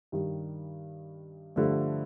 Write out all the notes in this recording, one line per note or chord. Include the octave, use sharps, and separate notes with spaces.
G2 D#3 G3
G2 D3 F3 A3